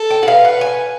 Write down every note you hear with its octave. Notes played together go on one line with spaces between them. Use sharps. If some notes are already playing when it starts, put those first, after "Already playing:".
Already playing: A4
G5
F#5
B4 F5
F#5
G#5